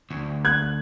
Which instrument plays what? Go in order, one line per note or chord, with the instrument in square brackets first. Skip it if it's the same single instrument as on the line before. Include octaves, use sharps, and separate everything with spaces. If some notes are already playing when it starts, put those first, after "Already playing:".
[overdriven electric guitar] D2
[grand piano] F#6 G#6